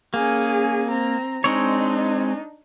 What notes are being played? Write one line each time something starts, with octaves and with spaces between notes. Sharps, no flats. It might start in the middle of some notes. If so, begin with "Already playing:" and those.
A#3 C#4 G#4
C4 A#5
G#3 C4 D4 D#4 C#5